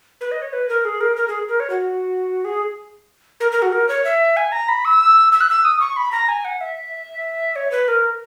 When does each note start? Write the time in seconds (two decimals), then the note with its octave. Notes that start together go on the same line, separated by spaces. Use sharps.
0.21 B4
0.31 D#5
0.42 C#5
0.53 B4
0.69 A#4
0.85 G#4
1.01 A#4
1.16 A#4
1.28 G#4
1.49 A#4
1.60 C#5
1.70 F#4
2.45 G#4
3.40 A#4
3.52 A#4
3.62 F#4
3.72 A#4
3.89 C#5
4.05 E5
4.37 G#5
4.52 A#5
4.68 B5
4.85 E6
5.32 E6
5.41 F#6
5.49 E6
5.65 D#6
5.80 C#6
5.97 B5
6.12 A#5
6.29 G#5
6.45 F#5
6.61 E5
7.56 C#5
7.72 B4
7.88 A#4